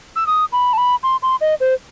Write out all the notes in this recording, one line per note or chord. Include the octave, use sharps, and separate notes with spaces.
E6
D#6
B5
A5
B5
C6
C6
D#5
C5